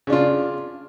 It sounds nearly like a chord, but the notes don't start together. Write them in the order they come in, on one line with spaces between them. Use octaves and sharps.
C#3 D4 F4